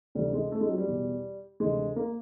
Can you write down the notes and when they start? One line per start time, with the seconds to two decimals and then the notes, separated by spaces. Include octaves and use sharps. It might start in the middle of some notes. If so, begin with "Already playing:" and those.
0.15 D2 C3 E3 G3
0.33 G#3
0.52 A3
0.61 G#3
0.69 F#3
0.78 G3
0.87 E2 B2
1.60 D2 C3 E3 G#3
1.96 A#3